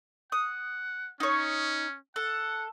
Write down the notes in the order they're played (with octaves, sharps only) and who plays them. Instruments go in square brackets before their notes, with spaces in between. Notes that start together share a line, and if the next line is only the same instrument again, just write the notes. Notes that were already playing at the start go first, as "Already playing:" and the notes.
[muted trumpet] F#5 [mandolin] D#6
[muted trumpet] C#4 [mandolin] D#4 C#5
[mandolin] A4 [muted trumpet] F#5